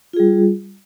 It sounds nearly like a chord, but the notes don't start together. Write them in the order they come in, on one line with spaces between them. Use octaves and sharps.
F4 G#4 G3